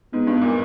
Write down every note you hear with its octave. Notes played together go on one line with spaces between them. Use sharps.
G#2 B3
G2
A#2